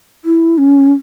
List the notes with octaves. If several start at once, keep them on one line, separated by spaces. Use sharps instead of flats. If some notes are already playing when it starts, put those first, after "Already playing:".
E4
C#4